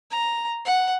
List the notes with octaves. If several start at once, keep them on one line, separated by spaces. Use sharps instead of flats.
A#5
F#5